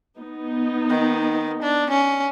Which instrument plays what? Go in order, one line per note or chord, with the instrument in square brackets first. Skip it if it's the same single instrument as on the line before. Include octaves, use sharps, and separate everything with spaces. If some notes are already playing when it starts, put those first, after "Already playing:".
[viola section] B3 D#4
[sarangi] D#3
D4
C#4